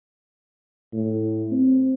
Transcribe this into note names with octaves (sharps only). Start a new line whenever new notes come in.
A2
C4